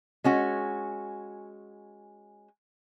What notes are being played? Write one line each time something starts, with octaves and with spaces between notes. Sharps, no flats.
G#3 C#4 F#4